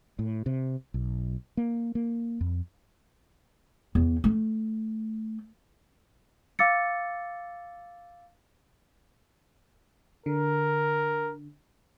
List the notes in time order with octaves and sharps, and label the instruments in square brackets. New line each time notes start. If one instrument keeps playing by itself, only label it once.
[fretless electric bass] A2
C3
B1
A#3
A#3
F2
[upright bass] E2
A3
[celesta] F5 D6 E6 A6 C#7
[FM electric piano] D3 [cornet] A#4